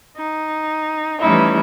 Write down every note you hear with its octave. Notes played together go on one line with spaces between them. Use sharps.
D#4
E3 G3 A3 C#4 D#4 E4